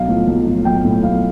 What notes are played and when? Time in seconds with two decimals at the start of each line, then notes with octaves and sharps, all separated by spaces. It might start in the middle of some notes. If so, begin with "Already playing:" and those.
Already playing: B1 F5
0.08 A2 F3
0.27 B1
0.46 A2 F3
0.65 B1 G5
0.85 A2 F3
1.03 B1 F5